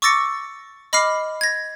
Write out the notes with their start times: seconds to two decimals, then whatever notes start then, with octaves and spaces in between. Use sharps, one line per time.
0.02 C#6 D6 E6 A6 A#6 C#7
0.93 D#5 B5 D6 F6 C7
1.41 G#6 A#6